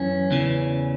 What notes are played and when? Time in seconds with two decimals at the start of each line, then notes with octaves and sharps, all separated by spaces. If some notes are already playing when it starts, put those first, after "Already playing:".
Already playing: F#2 E3 C#4
0.31 E2 C#3 E3